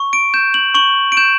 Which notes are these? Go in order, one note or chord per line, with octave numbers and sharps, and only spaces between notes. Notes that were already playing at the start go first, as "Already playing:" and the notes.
Already playing: C#6
D7
G6 E7
F#7
C#6 F#7
D7
G6 E7